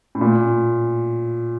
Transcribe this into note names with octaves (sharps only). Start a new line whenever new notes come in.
A2
A#2